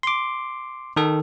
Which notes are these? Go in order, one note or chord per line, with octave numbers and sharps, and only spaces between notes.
C6 D6
D#3 A4